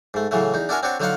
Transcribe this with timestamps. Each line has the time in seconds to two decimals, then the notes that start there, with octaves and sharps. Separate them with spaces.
0.14 G#2 A3
0.31 A2 C#3 E3 F#3 A3
0.54 E2 D#4
0.69 D4 E4 F#4 A#4 G#5
0.83 C4 D4 F#4 C#5
1.00 D3 F#3 D#4 F4 F5 F#5